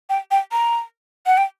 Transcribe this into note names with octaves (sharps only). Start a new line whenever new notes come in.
G5
G5
A#5
F#5
G5